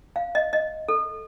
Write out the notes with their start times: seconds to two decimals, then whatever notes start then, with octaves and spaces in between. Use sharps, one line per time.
0.16 F5
0.35 D#5
0.53 D#5
0.88 A4